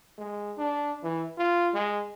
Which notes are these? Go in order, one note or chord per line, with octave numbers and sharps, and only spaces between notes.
G#3
D4
E3
F4
G#3